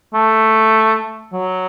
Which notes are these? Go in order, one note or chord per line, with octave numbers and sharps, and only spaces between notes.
A3
F#3